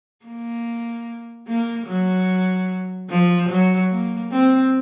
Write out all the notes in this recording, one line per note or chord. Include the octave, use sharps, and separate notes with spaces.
A#3
A#3
F#3
F3
F#3
A#3
C4